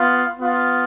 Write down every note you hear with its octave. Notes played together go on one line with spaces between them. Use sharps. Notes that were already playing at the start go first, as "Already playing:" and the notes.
Already playing: B3 F4
B3 F4